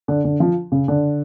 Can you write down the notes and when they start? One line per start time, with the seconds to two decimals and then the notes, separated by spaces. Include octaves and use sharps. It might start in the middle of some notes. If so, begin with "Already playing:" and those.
0.08 D3
0.25 D3
0.40 F3
0.72 C#3
0.88 D3